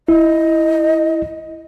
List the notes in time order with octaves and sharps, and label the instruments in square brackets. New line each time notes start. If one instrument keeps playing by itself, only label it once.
[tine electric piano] E4 [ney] D#5